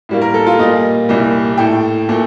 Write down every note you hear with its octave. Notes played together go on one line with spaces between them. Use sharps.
A2 G3 A#3
A#4
A4
F4
A#2 G3 A#3 D#5
C2 A#2 G3
A2 A3 G5
A#2 A3